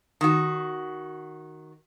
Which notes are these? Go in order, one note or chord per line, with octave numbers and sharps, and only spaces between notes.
D#3 F#4